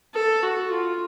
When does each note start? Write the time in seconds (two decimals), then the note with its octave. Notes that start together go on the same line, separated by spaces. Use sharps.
0.14 A4
0.43 F#4
0.71 F4